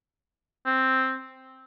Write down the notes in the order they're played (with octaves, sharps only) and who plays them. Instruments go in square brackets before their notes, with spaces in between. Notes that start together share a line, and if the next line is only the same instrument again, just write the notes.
[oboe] C4